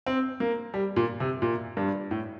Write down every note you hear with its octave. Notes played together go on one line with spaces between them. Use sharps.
C4
A#3
G3
A#2
C3
A#2
G2
A2